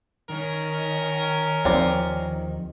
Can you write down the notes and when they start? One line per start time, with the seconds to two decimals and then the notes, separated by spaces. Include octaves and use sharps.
0.30 D#3 C#4 A#4
1.65 D#2 F3 C4 D5